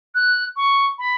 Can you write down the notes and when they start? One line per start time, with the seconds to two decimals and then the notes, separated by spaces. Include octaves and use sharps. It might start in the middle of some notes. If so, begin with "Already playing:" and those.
0.15 F#6
0.57 C#6
0.99 B5